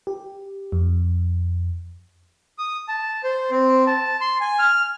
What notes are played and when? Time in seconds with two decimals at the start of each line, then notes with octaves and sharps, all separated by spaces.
0.07 G4
0.72 F2
2.58 D#6
2.88 A5
3.24 C5
3.51 C4
3.87 A5
4.21 C6
4.41 G#5
4.59 F6